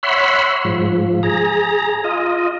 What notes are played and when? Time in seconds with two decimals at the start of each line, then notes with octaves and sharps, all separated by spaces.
0.03 C#5 E5 F#5 B5 C6
0.65 G#2 F3
1.23 G#4 A#5
2.04 F4 D#5